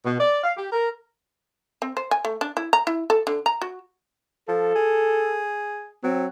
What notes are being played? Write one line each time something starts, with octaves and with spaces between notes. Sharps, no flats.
B2
D5
F5
G4
A#4
C4
C5
G#5
A3
D4
E4
A#5
E4
A4
D3
A#5
F#4
F3 A4
G#4
F#3 C4